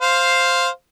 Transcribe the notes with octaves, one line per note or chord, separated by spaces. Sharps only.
C5 F5